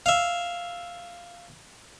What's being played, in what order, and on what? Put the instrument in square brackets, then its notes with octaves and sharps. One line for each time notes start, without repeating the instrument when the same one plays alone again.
[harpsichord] E5 F5